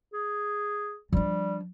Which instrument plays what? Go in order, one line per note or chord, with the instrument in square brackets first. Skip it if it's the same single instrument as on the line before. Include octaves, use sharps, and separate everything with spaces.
[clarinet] G#4
[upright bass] F3 D4 [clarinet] G3